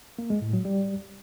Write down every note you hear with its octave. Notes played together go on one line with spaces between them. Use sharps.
A#3
G#3
A2
F#3
G3